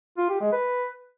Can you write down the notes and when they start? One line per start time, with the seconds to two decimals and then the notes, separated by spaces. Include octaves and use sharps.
0.18 F4
0.29 G4
0.41 G#3
0.53 B4